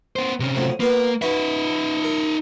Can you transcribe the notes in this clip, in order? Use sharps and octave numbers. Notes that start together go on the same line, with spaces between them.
B3 C5
C3 C#4
A2 F3 F#3
A#3 B3 F4 B4
D#4 F#4 B4 E5
A#4